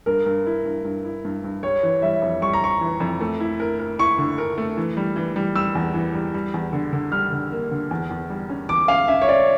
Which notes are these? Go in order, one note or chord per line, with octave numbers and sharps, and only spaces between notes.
G2 A#4
G2
E4
G2
G2
E4
G2
G2
G3 C#5
E3
G3 E5
F2
G3 C#6
A#5
G3 C#6
E3
F2
A3
E4
A#4
A#4
E4 C#6
D3
A#4
A3
E3
G3
E3
G3
G3 E6
E2
E3
G3
G3
E2
D3
D3
G3 F6
D3
A#3
D3
E2
E2
G3
C#4
E2 D6
C#4 F5
C#4 E5
C#5
C#4 D5